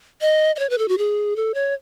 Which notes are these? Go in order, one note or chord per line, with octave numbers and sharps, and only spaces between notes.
D#5
D#5
C#5
B4
A4
F#4
G#4
A4
C#5